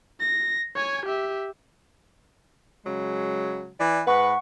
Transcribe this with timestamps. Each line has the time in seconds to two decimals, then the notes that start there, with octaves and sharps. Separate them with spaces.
0.20 A#6
0.76 C#5 G#5
1.06 G4 E5
2.85 C#3 F#3 G#3
3.80 E3 D5
4.07 G#2 B4 F#5 C#6